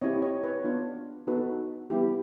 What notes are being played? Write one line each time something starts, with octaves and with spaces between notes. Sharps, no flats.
C4 E4 G4 C#5 D#5
C#5 D#5
B4 C#5
B3 D4 F4
B3 D#4 F#4 A4 B4
G3 B3 E4 G4